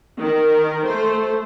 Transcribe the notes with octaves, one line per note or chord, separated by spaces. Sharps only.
D#3 A#4
A3 C5